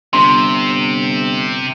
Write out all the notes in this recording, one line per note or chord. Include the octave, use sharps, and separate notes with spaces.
G1 C3 C6